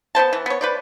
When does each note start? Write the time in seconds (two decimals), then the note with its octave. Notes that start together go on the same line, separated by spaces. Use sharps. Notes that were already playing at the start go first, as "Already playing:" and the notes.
0.15 B3 D4 C5 A5
0.33 E3
0.46 B3 C#5
0.61 B4 C5 D5